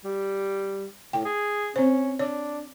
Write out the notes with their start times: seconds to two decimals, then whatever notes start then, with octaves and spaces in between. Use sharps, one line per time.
0.04 G3
1.13 A2 G5
1.25 G#4
1.76 C4 C#4 C5
2.19 D4 C#5